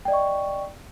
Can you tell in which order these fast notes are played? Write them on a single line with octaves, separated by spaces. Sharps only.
G5 D5 D#5 C#6